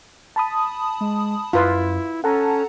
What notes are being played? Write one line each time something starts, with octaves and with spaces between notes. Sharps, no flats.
A5 B5 D#6
G#3
F#2 E4 F4 B4
C#4 A4 F#5 A5 A#5